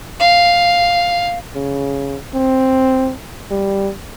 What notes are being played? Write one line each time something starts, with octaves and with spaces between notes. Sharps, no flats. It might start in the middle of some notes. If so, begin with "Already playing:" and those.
F5
C#3
C4
G3